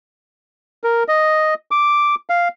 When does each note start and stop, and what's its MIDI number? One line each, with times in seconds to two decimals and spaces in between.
0.84 1.03 70
1.08 1.54 75
1.71 2.15 86
2.30 2.48 77